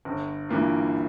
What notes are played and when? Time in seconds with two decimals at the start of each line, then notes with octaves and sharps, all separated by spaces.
0.05 G1
0.49 G2 E3 A#3 F4